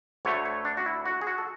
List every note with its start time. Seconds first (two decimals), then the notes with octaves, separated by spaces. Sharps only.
0.25 D2 D3 A3 C#5
0.46 C#5
0.65 D4
0.77 F#4
0.86 E4
1.06 F#4
1.22 G#4
1.27 F#4
1.38 A4